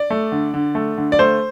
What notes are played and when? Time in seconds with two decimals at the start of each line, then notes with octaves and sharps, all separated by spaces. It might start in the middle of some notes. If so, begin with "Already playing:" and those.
Already playing: D5
0.10 A3
0.32 D3
0.54 D3
0.75 A3
0.98 D3
1.12 D5
1.19 A3 C5